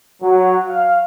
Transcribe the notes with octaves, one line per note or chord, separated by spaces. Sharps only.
F#3
F5